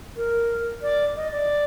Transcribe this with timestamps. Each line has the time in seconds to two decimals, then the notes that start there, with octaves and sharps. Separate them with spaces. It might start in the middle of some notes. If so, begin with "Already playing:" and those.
0.17 A#4
0.82 D5
1.16 D#5
1.32 D5